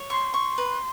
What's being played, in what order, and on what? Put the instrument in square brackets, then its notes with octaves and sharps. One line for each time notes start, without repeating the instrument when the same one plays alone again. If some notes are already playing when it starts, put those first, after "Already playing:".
Already playing: [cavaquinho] C#5
[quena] C6 [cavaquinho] C#6
[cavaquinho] C#6
B4